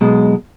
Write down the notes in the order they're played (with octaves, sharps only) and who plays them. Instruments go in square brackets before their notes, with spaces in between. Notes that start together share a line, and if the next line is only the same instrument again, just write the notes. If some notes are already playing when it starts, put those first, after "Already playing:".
[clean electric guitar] B1 B2 G#3